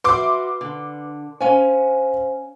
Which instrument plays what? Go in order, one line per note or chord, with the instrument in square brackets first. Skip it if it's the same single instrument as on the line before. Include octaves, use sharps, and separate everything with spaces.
[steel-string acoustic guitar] F#4 E5 [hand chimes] B4 [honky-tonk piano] C6 D6
[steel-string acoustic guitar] D3
[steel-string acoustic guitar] C#4 G#5 [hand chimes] C5 F5